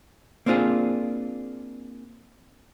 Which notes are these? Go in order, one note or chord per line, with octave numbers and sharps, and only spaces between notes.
A#3 C4 D4 F4 G#4